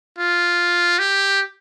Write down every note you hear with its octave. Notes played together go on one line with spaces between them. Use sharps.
F4
G4